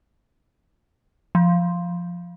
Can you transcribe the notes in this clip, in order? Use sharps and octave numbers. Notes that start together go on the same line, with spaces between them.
F3